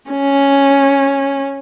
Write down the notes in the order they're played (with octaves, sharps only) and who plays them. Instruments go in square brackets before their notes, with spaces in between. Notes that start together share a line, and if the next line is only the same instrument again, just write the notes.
[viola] C#4